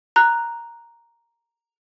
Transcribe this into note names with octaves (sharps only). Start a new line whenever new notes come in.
A#5 F#6